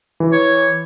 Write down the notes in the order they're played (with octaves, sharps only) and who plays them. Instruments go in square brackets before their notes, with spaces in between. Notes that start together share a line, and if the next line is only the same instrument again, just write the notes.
[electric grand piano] E3
[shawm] C#5